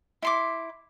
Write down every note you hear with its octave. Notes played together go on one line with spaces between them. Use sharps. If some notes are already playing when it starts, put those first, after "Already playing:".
E4 C6 D6